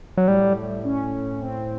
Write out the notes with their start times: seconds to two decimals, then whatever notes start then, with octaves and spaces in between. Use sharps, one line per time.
0.17 F#3
0.28 A2 G3
0.56 A2
0.84 C#4
1.12 A2
1.40 C4